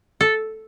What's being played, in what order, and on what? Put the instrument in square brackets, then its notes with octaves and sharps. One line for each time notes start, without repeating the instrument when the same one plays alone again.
[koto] A4